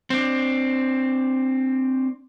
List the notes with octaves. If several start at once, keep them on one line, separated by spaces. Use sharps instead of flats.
C4 D4